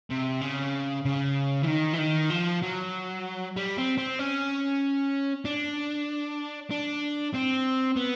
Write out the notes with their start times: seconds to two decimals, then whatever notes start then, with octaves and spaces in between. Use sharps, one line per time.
0.10 C3
0.41 C#3
1.05 C#3
1.62 E3
1.67 D#3
1.93 E3
1.99 D#3
2.30 F3
2.63 F#3
3.56 G3
3.77 C4
3.98 C4
4.19 C#4
5.45 D4
6.71 D4
7.34 C4
7.96 B3